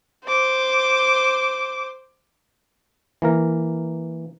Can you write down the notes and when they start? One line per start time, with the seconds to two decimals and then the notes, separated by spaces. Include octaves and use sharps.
0.25 C5 D6
3.22 E3 A#3 A#4